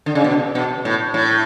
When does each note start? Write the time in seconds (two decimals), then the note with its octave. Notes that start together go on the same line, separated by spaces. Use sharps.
0.06 D3
0.15 C#3
0.24 B2
0.55 B2
0.85 A2
1.14 A2